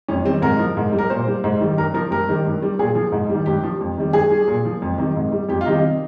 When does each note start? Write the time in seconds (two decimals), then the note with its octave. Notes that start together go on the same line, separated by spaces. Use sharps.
0.08 F2 C#4
0.25 D#3 G3 C4
0.42 G#2 A#4
0.59 F3
0.77 G#2
0.93 G3
0.98 A#4
1.10 A#2 C5
1.27 G3
1.44 G#2
1.61 D#3 G3
1.77 G2 A#4
1.94 F3 A#4
2.11 G2 A#4
2.29 D#3 G3
2.46 G2
2.62 G3
2.79 A#2 G#4
2.95 F3
3.12 G#2
3.29 D#3 G3
3.46 G2 G4
3.63 F3
3.81 F2
3.98 D#3 G3
4.13 G2 G#4
4.30 G3
4.48 A#2
4.65 F3
4.82 F2
4.98 C3 D#3 G3
5.16 G#2
5.32 G3
5.49 F2 G4
5.61 F4
5.65 C3 D#3 G3 D#4